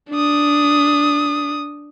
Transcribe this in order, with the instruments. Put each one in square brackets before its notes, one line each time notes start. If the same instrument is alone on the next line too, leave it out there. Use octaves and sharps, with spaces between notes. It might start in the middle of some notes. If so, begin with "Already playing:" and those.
[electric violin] D4 D#6